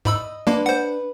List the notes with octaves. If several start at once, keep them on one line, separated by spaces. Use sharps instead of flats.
G#2 D#5 B5 E6
G#3 A#3 D4 B4
C5 F#5